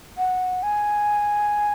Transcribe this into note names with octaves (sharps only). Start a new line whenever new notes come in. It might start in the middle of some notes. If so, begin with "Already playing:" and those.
F#5
G#5